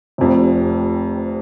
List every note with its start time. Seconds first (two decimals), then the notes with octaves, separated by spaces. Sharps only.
0.18 F1 F2 C3